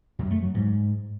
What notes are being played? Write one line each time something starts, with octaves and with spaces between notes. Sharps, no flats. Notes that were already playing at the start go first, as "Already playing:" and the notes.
F#2
A3
F#3
G#2